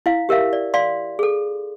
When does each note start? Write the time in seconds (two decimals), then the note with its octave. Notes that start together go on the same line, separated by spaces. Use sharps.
0.06 E4 F5
0.29 G4 A#4 E5 F5
0.53 D5
0.74 D5 F5 C6
1.19 G#4 A4